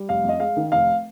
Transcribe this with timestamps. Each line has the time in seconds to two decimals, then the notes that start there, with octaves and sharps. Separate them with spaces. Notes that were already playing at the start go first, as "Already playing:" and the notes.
Already playing: G3
0.09 F1 F5
0.24 F2 D#5
0.40 G#3 F5
0.57 D#3
0.72 F1 F5